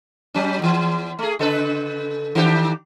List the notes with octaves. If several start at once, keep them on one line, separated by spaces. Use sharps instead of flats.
F#3 C#4
E2 E3
A3 G#4
C#3 A4 B4
D#3 D4 G4